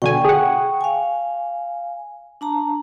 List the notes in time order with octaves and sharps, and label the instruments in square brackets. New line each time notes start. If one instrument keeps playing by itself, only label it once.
[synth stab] B2 D3 G#5 [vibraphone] G5 C#6
[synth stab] G#4 F#5
[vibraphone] F5 G#5
D4 A5 A#5